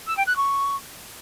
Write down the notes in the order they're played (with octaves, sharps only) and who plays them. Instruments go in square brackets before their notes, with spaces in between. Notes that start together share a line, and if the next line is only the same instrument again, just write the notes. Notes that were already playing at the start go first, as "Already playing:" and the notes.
[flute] E6
G5
F#6
C#6